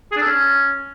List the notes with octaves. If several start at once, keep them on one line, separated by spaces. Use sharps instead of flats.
G#4
D4
A4
C#4